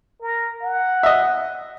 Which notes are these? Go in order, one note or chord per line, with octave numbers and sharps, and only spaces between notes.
A#4
F#5
D#5 E5